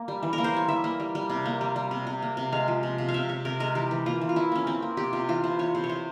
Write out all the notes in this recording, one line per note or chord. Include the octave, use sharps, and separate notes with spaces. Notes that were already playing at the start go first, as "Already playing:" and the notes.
Already playing: A#3
G3
E3
A#4
A#3
C5
G3 C#5
E3 E5
A#3
G3
G3
C3
A#3
G3
G3
C3
C3
A#3
C3
G#3 F5
F3
C3
C3
F5
C3 E5
C3 C#5
C3 A#4
G#3 A#4
E3 G4
E3
A#3 F4
E3
F4
E3 E4
A#3 C#4
A#3 C4
A#3
C3 G4
C3 F4
E3 F4
C3 C5
E3 C#5
C3 C5
C#5
C3 C5